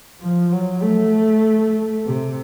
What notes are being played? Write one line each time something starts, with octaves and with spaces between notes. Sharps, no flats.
F3
F#3
A3
C3